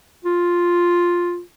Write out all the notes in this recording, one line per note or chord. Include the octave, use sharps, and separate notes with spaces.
F4